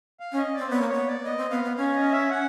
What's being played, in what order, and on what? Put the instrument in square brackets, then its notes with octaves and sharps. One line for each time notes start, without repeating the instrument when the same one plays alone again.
[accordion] F5
[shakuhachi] C#4
[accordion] D#5
[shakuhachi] C4 [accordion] D5
[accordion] C5
[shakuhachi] B3 [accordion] C#5
[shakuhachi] A#3
[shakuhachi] B3 [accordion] C#5
[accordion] D5
[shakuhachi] B3 [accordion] D#5
[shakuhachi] C4
[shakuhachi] B3 [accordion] F5
[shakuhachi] B3
[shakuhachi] C#4 [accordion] F5
[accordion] D#5
E5
F#5